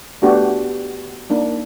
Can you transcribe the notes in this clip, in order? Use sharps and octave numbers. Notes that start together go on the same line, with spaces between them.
A3 B3 D4 F#4 G4
A#3 D4 D#4